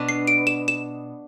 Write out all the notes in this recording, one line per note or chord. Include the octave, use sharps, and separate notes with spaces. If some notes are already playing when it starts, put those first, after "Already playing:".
Already playing: B2 B3 D4
C7
D7
E7
E7